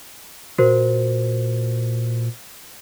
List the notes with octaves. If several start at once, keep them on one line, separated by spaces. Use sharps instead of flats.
A#2 F#4 A#4 C5